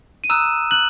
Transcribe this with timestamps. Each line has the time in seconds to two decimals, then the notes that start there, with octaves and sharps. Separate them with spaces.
0.24 D#7
0.30 A#5 D#6 E6 F#6 E7
0.71 F#6 F#7